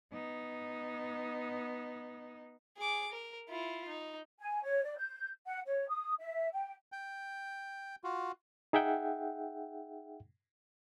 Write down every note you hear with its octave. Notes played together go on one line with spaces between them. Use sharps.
B3 D#4
G#4 D6
A#4
E4 F4
D#4
G#5
C#5
D5
G6
F#5
C#5
D#6
E5
G5
G5
F4 F#4
D#4 G#4 E5 F#5 G5